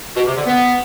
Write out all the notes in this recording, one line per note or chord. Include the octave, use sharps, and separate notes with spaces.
B2
C3
D3
B3